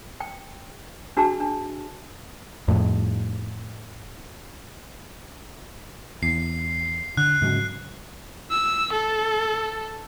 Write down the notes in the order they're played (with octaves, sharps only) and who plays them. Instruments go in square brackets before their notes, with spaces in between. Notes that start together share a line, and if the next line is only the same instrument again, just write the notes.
[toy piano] G5
D4 F#4 G#4 A5
D4
[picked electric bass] F2 A2
[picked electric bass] E2 [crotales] C7
[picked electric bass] D3 [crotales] F#6
[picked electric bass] G#2 C#3 F#3
[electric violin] E6
A4